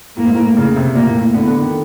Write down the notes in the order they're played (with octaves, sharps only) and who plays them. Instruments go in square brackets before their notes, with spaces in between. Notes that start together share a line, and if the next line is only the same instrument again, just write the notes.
[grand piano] A2 [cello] A#3
[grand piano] G#2
A2
C#3
C3
[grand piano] A#2 [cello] A#3
[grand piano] A2
A2
[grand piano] D3 [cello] B3
[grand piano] D3
D#3